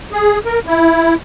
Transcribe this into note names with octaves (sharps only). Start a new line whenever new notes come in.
G#4
A#4
E4